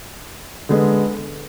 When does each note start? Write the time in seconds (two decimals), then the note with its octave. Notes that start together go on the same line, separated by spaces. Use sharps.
0.69 D3 G#3 B3